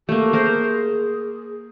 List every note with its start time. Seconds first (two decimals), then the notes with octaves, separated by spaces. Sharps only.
0.09 A3 A#3 G4
0.33 G#4 A#4 C5